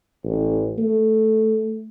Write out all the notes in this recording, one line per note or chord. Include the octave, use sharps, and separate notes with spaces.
A1
A3